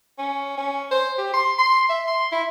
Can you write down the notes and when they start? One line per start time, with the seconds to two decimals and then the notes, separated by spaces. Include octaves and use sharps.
0.18 C#4
0.57 C#4
0.91 C5
1.18 G4
1.33 C6
1.59 C6
1.89 E5
2.07 C6
2.32 E4